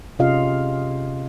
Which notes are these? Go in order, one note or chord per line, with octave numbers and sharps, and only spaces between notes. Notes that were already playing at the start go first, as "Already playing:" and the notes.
C3 C#4 F4 G#4 D#5 F5